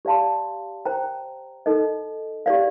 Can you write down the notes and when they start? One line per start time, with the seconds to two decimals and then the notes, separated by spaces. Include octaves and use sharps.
0.05 G4 D5 F5 A5 C6
0.85 C5 G5 A#5
1.66 D#4 A4 D#5
2.46 G4 D5 F5